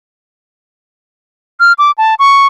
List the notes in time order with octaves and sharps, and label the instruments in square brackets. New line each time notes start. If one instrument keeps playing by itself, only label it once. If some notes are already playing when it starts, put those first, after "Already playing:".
[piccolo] F6
D6
A5
C#6